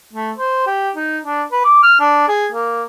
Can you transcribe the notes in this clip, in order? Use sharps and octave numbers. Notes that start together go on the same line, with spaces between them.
A3
C5
G4
D#4
D4
B4
D6
F6
D4
G#4
A#3